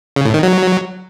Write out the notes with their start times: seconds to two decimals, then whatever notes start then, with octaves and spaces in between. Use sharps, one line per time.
0.16 C#3
0.25 A2
0.34 D#3
0.43 F#3